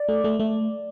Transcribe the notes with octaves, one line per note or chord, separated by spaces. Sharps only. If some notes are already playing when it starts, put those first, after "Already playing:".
Already playing: D5
A3
A3
A3